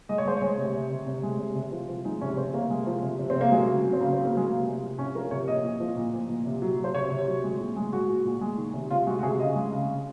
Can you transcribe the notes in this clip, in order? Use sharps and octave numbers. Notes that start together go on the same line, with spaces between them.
G#3 D#5
C#5
G#3 C5
G#3 C#5
C3
C3
C3
C3
G#3
C3
C3
F3
F3
G#3 D#4
C3 C#4
C3 C4
C3 A#3
G#3
F3
C3
C3
C4
C3
A#3
F#3 G#3
C#3
F#3
C4
C#3 A#3
C4
F#3
A#3
F#3 G#3
C3 A#3
C3
F3
C3 C#4
F3 A#4
C3 C#5
A#2 D#5
A#2
F3
A#2
A#2
A#2
C3
F#3
F#3
C5
C3 C#5
C3
F#3
G#3
A#2
G#3
G#3 F#4
A#2
A#2
G#3
D#3
C3
C3 F4
G#3 F#4
F#4
C3 G#4
C#3 D#5
G#3
C#3
C#3